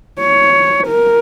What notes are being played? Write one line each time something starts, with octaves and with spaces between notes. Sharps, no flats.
C#5
A#4